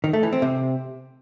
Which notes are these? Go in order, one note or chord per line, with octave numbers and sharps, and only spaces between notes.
D#3
A3
E3
C4
C3